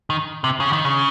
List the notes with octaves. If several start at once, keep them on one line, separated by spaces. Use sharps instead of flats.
D#3
C3
C#3
D#3
C#3